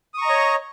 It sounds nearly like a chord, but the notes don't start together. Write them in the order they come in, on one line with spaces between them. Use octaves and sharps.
D#6 C#6 A#5 D#5 C#5